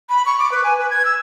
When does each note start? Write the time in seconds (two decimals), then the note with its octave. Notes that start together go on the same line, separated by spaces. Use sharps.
0.09 B5
0.26 C#6
0.39 D6
0.52 B4
0.64 G#5
0.78 B4
0.90 G#6
1.05 E6